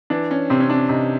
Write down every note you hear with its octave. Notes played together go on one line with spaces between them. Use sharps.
E3 D4
C#4
C3 C4
C#4
D4
C3 D#4